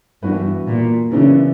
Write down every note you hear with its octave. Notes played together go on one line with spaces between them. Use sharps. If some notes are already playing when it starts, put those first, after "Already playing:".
G2 E3 B3 F#4 B4
A#2
F#2 C#3 E3 B3 D4